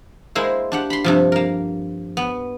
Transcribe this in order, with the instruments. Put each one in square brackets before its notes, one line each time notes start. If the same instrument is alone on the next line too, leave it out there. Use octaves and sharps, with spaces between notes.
[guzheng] G#3 A#3 E4 C5
D4 G4 F#5
B5 C6
G2 C3 F3
A#3 A#4
B3